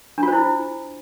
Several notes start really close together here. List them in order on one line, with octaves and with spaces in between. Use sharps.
D4 F4 C5 E4